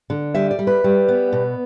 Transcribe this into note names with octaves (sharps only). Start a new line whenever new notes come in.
D3
G3 E5
D5
G3
B4
G3
B3
B2